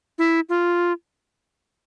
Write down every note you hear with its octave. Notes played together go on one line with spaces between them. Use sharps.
E4
F4